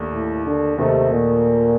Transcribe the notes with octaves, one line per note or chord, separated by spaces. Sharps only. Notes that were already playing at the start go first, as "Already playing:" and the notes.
Already playing: D#2 A3 D4
A2
D3
D#2 C3 D#3 A3 D#4 A4
A#2